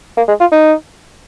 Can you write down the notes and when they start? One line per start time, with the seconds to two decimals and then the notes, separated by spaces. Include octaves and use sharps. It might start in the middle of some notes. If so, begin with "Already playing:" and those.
0.17 A#3
0.28 G#3
0.40 F4
0.52 D#4